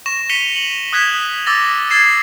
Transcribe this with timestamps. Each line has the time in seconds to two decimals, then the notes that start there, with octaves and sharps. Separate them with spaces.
0.06 C#6 A#6 E7
0.29 B6 C#7 D#7 F7 G7
0.55 F#7
0.93 D#6 F#6 G#6 B6 E7
1.46 D6 E6 A6 A#6
1.90 E6 G#6 A6 C7 E7